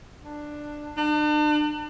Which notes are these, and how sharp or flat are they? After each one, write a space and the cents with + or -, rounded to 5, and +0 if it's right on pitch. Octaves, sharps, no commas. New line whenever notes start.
D4 +10
D4 +40